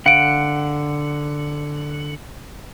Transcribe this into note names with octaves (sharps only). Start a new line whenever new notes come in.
D3 F5 F#5 D7